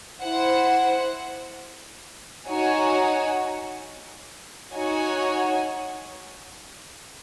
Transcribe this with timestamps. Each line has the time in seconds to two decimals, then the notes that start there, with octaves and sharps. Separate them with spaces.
0.21 E4 C5 F#5
2.48 D#4 F#4 C#5 G#5
4.74 D#4 F#4 C#5 G#5